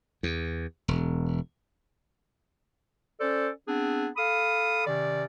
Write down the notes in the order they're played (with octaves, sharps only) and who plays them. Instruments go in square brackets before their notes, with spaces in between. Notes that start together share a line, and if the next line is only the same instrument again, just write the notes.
[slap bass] E2
E1
[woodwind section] C#4 A4 C5 D5
B3 C4 D4 G#4
A4 F5 B5 D#6
C3 D#3 C#4 D5